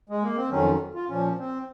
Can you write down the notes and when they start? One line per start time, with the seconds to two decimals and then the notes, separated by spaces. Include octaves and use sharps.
0.09 G#3
0.23 A#3
0.36 C4
0.50 F2 D#3 F#3 C#4
0.94 F4
1.08 A#2 F3 C#4
1.38 C4